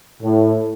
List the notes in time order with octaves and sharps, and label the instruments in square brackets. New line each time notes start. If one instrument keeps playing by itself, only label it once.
[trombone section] A2